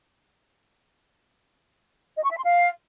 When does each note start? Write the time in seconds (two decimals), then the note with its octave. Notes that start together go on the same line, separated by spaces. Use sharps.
2.17 D#5
2.24 C#6
2.31 E5
2.38 C6
2.44 F5